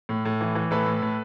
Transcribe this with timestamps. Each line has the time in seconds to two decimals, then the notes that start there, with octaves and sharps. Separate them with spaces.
0.09 A2
0.25 A2
0.41 E3
0.55 E3
0.71 A2 A4 B4
0.86 A2
1.02 A2